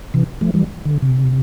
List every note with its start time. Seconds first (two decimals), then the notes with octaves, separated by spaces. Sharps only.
0.14 C3 E3
0.41 F3 A3
0.54 E3 G3
0.85 D3
1.02 C3